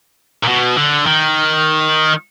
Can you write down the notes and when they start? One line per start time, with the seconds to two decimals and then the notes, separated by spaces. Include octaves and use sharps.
0.44 A#2
0.48 B2
0.77 D3
1.06 D#3